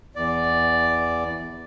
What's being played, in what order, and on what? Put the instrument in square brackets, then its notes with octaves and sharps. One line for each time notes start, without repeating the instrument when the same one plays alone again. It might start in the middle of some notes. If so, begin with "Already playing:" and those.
[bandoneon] E2 D5